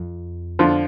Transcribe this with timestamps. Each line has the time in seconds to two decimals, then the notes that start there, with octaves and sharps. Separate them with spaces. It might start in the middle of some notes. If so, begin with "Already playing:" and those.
Already playing: F2
0.59 D3 F3